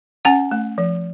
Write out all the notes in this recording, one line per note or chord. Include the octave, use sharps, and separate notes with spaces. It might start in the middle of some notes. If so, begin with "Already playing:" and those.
C#4 F#5 G#5
A3
F3